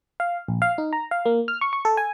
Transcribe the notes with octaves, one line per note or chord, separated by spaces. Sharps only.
F5
A#1
F5
D#4
A#5
F5
A#3
F6
C#6
C#6
A4
G#5